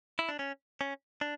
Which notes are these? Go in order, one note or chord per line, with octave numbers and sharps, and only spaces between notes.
E4
D4
C#4
C#4
D4